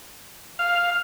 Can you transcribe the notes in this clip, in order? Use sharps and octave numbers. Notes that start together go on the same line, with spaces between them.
F5